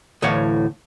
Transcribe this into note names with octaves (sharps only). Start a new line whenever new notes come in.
D2 A2 E3 C#5 F5 F#5